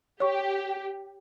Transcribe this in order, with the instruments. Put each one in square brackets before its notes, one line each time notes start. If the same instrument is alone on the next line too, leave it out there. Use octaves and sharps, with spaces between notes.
[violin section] G4 [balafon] C#5 C#6